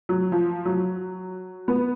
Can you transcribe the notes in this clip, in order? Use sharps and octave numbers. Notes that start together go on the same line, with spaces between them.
F#3
F3
F#3
B3